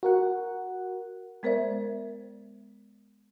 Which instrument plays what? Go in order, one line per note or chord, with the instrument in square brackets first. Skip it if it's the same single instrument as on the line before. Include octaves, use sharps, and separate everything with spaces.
[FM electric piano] F#4 A#4 F#5
[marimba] G#3 B3 A#4 C5 D5 E5